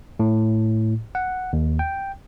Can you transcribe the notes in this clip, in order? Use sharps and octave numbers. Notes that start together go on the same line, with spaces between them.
A2
F#5
D#2
G5